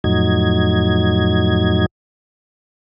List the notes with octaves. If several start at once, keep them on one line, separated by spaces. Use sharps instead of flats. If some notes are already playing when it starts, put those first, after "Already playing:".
F2 A2 F#3 D#4 G#6